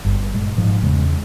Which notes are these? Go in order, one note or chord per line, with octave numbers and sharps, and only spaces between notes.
G1 G2
A#2 G#3
G#2 F3
E2 C#3 G#3